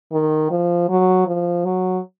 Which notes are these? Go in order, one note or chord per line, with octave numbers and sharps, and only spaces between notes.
D#3
F3
F#3
F3
F#3